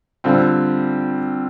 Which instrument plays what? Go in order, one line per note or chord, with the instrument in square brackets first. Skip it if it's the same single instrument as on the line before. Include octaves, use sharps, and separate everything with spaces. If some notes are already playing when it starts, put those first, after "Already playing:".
[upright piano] D3 G3 C4 F4